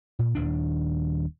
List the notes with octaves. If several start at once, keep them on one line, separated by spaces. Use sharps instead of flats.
A#2
D#1 D#2 D4